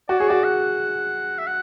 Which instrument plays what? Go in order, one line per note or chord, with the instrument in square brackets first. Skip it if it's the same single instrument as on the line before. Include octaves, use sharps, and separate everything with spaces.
[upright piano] F#4 [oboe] D5
[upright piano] G#4 [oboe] C#5
[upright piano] F#4 [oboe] D5
[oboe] F#5
E5
F#5